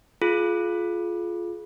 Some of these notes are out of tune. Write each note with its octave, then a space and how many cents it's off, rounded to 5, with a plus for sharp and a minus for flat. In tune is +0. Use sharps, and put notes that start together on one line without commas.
F4 +0 G#4 +35